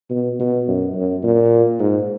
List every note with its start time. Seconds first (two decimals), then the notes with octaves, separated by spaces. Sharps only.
0.10 B2
0.40 B2
0.68 F#2
0.95 F#2
1.23 A#2
1.80 G#2